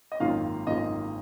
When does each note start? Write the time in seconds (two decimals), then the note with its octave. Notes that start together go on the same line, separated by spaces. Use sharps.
0.12 D#5
0.20 G#1 F#2 D#3 A#3 F4 F5
0.67 G#1 F#2 D#3 A#3 F4 D#5